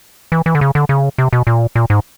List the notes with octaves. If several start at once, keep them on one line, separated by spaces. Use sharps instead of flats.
E3
E3
D3
C#3
D3
C#3
C3
B2
A#2
A#2
G#2